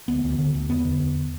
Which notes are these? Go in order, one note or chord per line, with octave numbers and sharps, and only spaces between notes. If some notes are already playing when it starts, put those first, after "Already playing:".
D2 B3
D2
D3
D2
E2 B3
D3
E2